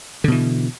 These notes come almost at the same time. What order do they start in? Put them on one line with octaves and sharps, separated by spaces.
D3 B2 E3